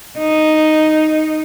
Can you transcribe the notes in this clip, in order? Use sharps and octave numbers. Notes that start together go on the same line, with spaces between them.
D#4